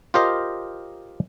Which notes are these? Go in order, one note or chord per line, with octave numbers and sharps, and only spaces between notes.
F4 G4 A#4 C5 D#5 F5